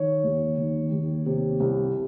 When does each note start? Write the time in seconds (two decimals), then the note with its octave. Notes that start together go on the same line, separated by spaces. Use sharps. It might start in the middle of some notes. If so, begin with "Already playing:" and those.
Already playing: D#3 C#5
0.24 D#2
0.58 D#3
0.92 D#2
1.26 C3
1.60 C2